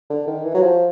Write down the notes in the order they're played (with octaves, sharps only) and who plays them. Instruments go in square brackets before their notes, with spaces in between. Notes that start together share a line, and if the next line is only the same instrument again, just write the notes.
[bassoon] D3
D#3
E3
F#3
F3